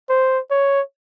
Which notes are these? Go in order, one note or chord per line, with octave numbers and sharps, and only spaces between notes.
C5
C#5